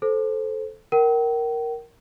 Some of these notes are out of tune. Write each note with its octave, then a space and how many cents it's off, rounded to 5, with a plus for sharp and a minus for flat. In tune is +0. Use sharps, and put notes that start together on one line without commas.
A4 -10 C5 +0
A#4 +0 G5 -40